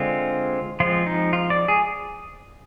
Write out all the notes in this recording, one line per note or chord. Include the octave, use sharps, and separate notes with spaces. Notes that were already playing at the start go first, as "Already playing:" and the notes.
Already playing: D3 G#3 C4 F4
F3 G#3 C4 F4
D#4
F4
D5
G#4